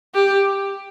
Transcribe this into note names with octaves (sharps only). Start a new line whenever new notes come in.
G4